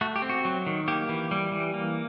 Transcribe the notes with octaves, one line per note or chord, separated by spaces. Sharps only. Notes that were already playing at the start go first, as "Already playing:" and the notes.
A3 F#4
G4
C4
F#4
F#3
D#3
A#3 G4
E3
G3
E3
A#3